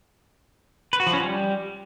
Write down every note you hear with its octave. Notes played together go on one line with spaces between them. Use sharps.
B4
F#4
F3
C#4
G3